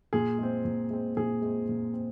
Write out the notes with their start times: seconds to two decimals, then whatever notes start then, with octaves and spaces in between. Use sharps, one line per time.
0.13 A#2 G#4
0.39 G#3 C4
0.65 A#2
0.90 G#3 C4
1.17 A#2 G#4
1.42 G#3 C4
1.69 A#2
1.94 C4